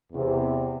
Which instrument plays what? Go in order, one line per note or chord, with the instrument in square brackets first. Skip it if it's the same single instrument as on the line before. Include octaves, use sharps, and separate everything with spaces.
[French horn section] E2 C3